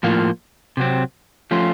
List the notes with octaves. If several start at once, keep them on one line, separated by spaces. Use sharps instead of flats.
A2 F3 A#3 F4
C3 F#3 C4
F3 A3 C#4 F4